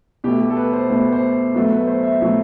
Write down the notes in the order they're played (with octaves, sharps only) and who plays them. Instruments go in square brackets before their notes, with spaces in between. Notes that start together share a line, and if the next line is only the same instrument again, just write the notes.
[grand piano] B2 A3 G4
G4
A4
B4
C5
B2 A3 C5
B4
C5
B2 F#3 A3 B4
B4
C5
E5
B2 F#3 A3